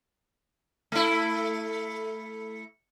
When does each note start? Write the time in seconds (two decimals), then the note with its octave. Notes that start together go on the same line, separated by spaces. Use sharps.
0.92 A3 E4